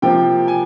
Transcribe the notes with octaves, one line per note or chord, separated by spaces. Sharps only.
C3 F3 A#3 G5
G#5